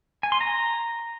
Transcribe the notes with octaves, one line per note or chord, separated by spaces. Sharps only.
G#5
C6
A#5